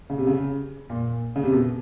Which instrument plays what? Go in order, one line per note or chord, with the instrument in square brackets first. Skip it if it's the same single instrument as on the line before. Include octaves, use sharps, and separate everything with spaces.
[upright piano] C#3
C3
C#3
A#2
C#3
C3
B2